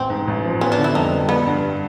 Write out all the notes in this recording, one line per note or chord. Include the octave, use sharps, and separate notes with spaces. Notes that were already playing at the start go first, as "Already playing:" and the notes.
Already playing: A1 C4
G#2
A1
F3
B3 C#4
D4
D3
E4
F2 D#4
G3
G3 B3
G2